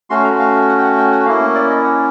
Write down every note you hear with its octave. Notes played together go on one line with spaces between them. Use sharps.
A3 C#4 F#4 C6
A#5
F5
F#5
G5
F#5
G5
F#5
A#3 C#4 E4 F5
D5
D#5
F#5